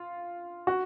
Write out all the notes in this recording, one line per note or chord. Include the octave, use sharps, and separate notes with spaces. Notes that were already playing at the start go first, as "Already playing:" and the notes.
Already playing: F4
F#4